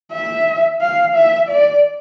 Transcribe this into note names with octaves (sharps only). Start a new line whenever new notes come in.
E5
F5
E5
D5